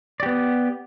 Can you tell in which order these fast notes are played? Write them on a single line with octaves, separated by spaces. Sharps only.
D5 G4 B3